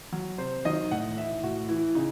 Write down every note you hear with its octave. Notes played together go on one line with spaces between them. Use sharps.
F#3
C3 C5
D#3 F#3 D#5
A2 F#5
E3 E5
A2 F#4
E3 E4
C#3 D#4